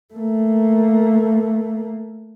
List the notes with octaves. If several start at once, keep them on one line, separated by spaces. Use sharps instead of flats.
A3 A#3